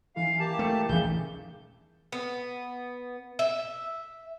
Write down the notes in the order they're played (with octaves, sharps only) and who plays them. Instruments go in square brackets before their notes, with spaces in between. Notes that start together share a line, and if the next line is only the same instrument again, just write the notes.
[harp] E3 C#4 [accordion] F5
[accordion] A#3 G4 A5
[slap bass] A3
[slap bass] A#1 D#2 [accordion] C#3 G6 [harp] E3
[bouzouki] B3
E5